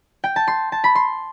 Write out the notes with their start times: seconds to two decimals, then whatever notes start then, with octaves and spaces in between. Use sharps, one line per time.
0.24 G5
0.36 A5
0.48 C6
0.72 A5
0.84 B5
0.95 C6